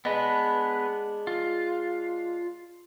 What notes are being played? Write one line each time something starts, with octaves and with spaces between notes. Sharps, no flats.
G#3 B3 D4 B4
F4